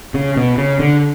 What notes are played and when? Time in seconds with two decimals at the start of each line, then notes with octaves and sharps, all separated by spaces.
0.14 C#3
0.37 B2
0.58 C#3
0.79 D3